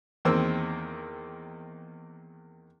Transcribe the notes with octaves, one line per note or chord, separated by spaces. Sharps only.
E2 D#3 A#3 C4 E6